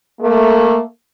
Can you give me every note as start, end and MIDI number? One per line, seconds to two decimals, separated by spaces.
0.20 0.79 57
0.20 0.79 58